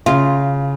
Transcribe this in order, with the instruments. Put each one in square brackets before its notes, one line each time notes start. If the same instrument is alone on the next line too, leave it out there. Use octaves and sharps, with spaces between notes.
[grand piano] C#3 [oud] F4